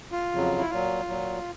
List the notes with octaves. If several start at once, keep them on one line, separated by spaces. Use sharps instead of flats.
F4
F2 C#3 F#3
E4
A#2 F#3 F4
A#2 F#3